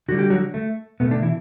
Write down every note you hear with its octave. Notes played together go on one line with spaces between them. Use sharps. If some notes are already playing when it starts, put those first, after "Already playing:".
D3 G3 F#4
G4
F#3 F#4
A3
B2 A3 B3
D3 D4
E3 E4